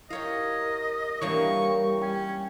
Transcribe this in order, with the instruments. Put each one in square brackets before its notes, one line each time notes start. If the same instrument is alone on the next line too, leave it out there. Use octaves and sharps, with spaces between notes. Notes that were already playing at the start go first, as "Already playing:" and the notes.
[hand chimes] E4 [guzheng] G4 C#5 F5 [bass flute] A#4 [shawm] D#5
[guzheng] E3 A#3 D4 [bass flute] G3 [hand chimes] E4 C#5 [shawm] C#6
[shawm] C#4 [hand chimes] G5